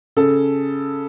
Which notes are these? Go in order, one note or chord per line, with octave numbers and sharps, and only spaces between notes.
C#3 A4